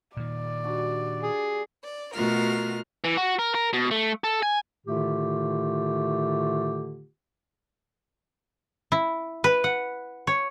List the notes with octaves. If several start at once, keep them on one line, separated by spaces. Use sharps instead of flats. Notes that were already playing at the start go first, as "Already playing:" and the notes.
A#2 D#3 D5
G3 D4 F#4
G#4
D5
B2 A3 F4 F#4 A#4 F6
E3
F#4
A#4
A#4
B2
A3
A4
G#5
A2 D3 D#3 A3 F4 G4
E4
B4
F#5
C#5